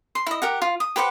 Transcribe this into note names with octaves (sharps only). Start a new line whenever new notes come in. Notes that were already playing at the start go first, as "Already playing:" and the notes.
C6
E4 D#5
G4 A#4 F#5
F4
D#6
G4 B4 C5 F#5